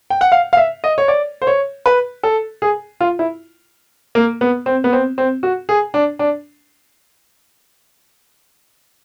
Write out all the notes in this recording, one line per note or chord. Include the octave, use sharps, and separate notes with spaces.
G5
F#5
F5
F5
E5
D#5
C#5
D5
C5
C#5
B4
A4
G#4
F4
E4
A#3
B3
C4
B3
C4
C4
F#4
G#4
D4
D4